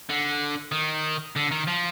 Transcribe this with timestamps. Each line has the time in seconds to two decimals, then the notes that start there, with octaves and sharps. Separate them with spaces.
0.09 D3
0.72 D#3
1.36 D3
1.51 D#3
1.67 F3